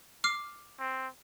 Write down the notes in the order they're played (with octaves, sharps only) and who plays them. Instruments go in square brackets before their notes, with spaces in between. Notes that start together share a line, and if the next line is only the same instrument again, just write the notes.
[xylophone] D6 F6 C7
[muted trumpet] C4